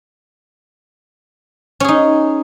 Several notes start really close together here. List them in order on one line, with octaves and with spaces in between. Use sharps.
C#4 G#4 D#4